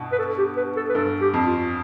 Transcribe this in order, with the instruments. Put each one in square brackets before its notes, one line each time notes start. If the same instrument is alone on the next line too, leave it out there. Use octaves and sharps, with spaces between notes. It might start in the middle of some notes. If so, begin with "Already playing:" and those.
Already playing: [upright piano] G2 B2
[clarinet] B4
A4
G4
B4
A4
B4
[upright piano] G2 [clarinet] A4
[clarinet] G4
[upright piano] F2
[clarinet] F4